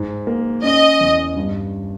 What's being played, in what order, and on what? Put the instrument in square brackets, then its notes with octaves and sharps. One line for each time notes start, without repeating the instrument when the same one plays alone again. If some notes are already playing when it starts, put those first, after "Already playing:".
Already playing: [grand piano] G#2
A#3
[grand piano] C#4 [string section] D#5
[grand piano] E2
G2